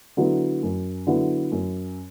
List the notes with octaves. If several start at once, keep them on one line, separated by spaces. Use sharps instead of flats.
D3 F#3 B3 E4
F#2
D3 F#3 B3 E4
F#2